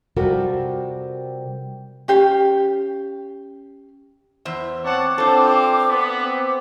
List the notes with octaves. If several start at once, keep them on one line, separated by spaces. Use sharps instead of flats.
C3 G3 F4 F#4 A4 A#4
C#4 G4 F5
E2 C5 E5
C4 C#5 F#5 A5 D6
C4 D4 F4 A4 C5
B3
C4